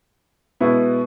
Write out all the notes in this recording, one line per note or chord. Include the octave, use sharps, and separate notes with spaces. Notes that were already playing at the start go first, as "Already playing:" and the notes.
B2 G#3 B3 E4